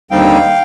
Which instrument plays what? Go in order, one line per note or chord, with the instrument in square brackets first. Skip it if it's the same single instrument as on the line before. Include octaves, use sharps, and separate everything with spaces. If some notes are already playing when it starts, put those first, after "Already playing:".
[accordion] D#2 D3 G3 C4 D#4 F5 G5